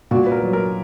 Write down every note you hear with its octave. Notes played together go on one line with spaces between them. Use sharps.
A#2 F#4
B4
A#4
F#3
A#4